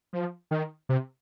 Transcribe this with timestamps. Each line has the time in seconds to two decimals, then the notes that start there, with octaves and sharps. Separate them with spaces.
0.13 F3
0.51 D#3
0.89 C3